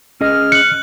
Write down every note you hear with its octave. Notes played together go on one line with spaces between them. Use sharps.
C#4 G#4 D#5 F6
F#6 C#7 F#7